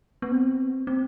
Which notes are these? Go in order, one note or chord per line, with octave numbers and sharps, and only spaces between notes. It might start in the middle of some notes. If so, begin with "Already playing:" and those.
B3
C4
C4